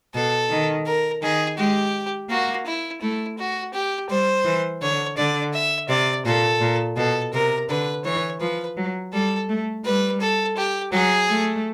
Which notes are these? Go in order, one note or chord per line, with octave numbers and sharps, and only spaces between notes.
B2 A4
D#3
A#4
D#3 G#4
G#3 G4
A#3 F#4
E4
A3 E4
F#4
G4
G3 C5
E3
D3 C#5
D3 D5
E5
C3 D5
A#2 A4
A#2
B2 A4
C3 A#4
D3 B4
E3 C#5
F3 B4
F#3
G3 A4
A3
G3 B4
A4
G4
F#3 G#4
A3